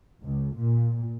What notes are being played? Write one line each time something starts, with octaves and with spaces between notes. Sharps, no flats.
C#2
A#2